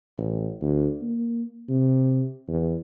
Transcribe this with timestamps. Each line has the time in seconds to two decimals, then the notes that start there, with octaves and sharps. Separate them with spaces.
0.18 A1
0.61 D2
1.02 A#3
1.69 C3
2.47 E2